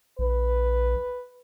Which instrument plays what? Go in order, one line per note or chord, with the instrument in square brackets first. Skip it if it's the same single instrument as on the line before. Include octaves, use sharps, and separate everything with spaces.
[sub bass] A#1 [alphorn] B4